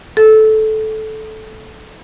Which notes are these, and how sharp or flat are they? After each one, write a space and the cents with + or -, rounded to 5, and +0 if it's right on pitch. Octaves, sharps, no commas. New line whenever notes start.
A4 -15